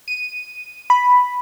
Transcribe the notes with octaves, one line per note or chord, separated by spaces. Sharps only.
D#7
B5